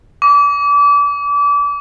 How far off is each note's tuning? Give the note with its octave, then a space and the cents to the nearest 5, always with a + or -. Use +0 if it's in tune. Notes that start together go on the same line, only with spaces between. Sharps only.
D6 -30